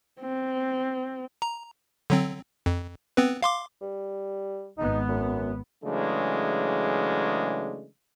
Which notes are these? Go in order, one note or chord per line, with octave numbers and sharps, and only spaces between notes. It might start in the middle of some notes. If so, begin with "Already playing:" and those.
C4
A#5
D3 F#3 C4
F2
B3 C4 B4
F5 C6 D6
G3
G#1 B3 D#4
F#2
C#3 E3 F#3 G#3 A3 D4